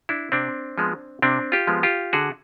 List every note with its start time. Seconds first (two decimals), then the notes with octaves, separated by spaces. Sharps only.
0.09 D4 E4
0.32 C3 C4 D4
0.78 F3 G#3 B3
1.22 C3 C4 D4
1.52 F4 G4
1.67 F3 G#3 B3
1.83 F4 G4
2.13 D3 F#4 G#4